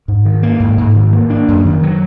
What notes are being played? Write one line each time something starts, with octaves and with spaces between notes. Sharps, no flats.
G#2
D#3
A#3
G#2
G#2
D#3
A#3
D4
F#2
D#3
F#3